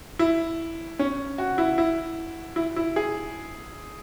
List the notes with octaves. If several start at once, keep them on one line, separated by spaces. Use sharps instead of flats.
E4
C#4
F#4
E4
E4
E4
E4
G#4